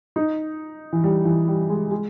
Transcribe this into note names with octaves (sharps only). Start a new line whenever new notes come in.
D#4
E3
G3
E3
G3
G#3
G#3